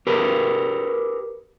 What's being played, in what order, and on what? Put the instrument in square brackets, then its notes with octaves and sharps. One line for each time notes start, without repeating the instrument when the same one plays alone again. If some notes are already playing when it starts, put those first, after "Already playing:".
[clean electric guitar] G4 A#4 B4